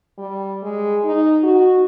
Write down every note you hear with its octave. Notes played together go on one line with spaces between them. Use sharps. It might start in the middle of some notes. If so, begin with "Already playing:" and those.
G3
G#3
D#4
F#4